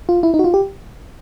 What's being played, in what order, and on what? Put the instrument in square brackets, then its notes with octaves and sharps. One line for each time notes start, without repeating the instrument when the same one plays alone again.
[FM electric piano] F4
E4
D#4
F#4
F4
G4